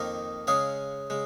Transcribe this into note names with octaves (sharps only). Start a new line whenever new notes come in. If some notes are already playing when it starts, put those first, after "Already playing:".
Already playing: F2 D#3 A#3 D#4 A#4
C#3 G#3 C#4 G#4 F5
C#3 G#3